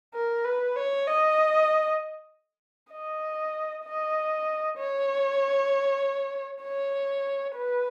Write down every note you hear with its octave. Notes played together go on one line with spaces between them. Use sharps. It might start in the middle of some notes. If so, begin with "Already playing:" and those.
A#4
B4
C#5
D#5
D#5
D#5
C#5
C#5
B4